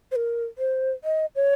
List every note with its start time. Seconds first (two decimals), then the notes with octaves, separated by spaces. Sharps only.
0.12 C5
0.16 A#4
0.58 C5
1.04 D#5
1.36 C#5